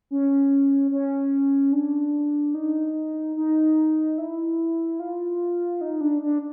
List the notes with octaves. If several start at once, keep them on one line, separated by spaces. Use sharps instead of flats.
C#4
C#4
D4
D#4
D#4
E4
F4
D#4
D4
D4